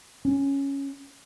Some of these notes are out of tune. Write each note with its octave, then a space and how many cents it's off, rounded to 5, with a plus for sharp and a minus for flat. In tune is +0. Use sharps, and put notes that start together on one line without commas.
C#4 +0